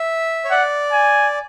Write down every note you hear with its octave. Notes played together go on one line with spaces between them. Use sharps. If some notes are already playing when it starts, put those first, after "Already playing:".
Already playing: E5
C#5
D5 F#5
G#5